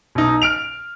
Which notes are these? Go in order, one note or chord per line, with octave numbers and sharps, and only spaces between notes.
B1 D#4
F6 D7 F7